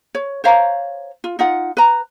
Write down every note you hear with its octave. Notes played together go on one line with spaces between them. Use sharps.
C#5
C5 C#5 F5 A#5
F4
D#4 F4 F#5
B4 A#5